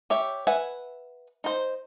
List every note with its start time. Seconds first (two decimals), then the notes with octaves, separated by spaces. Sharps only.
0.10 G4 C#5 E5
0.47 B4 E5 F#5 G#5
1.44 D#4 C5